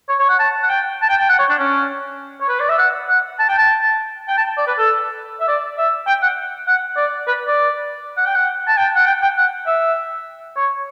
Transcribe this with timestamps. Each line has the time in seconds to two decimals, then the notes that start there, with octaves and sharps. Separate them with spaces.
0.09 C#5
0.19 C#5
0.29 F#5
0.39 A5
0.63 F#5
0.69 G5
1.02 A5
1.09 G5
1.19 G5
1.29 F#5
1.39 C#5
1.49 D4
1.59 C#4
2.41 C#5
2.49 B4
2.60 D5
2.69 E5
2.78 F#5
3.09 F#5
3.39 A5
3.48 G5
3.58 A5
4.28 G5
4.37 A5
4.58 D5
4.67 B4
4.78 A4
5.40 E5
5.48 D5
5.78 E5
6.07 G5
6.22 F#5
6.67 F#5
6.97 D5
7.27 B4
7.48 D5
8.17 F#5
8.26 G5
8.35 F#5
8.67 A5
8.77 G5
8.95 F#5
9.06 G5
9.22 G5
9.37 F#5
9.66 E5
10.56 C#5